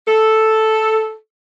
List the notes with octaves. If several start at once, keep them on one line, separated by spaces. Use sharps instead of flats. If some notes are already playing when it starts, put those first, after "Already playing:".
A4